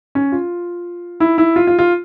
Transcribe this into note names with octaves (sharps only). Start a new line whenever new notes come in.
C#4
F4
E4
E4
F4
F4
F4